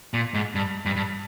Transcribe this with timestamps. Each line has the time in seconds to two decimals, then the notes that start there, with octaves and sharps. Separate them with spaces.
0.14 A#2
0.34 G#2
0.55 G2
0.85 G2
0.96 G2